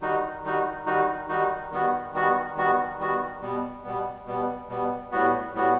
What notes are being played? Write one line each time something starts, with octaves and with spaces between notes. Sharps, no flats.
D#3 G3 D#4 F#4
D#3 G3 D#4 F#4
D#3 G3 D#4 F#4
D#3 G3 D#4 F#4
D#3 G3 B3 F#4
D#3 G3 B3 F#4
D#3 G3 B3 F#4
D#3 G3 B3 F#4
B2 G3 B3
B2 G3 B3
B2 G3 B3
B2 G3 B3
A2 G3 B3 F#4
A2 G3 B3 F#4